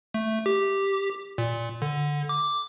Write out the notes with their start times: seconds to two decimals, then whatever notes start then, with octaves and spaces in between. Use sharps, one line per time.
0.14 A3
0.46 G4
1.38 A#2
1.82 D3
2.29 D6